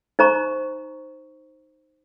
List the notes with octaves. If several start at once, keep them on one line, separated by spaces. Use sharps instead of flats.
D#4 C5 A#5 C#6